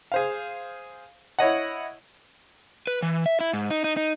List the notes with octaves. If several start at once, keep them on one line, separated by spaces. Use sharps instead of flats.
G#4 C5 F5
E4 C#5 D#5 F#5
B4
E3
E5
E4
G#2
D#4
D#4
D#4